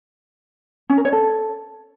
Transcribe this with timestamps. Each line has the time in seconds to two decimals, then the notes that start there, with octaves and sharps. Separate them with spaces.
0.90 C#4
0.97 A#4
1.05 C#5
1.13 A4